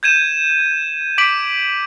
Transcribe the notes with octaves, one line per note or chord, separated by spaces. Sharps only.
G6 G#6 D#7 E7
D6 B6 D7 F#7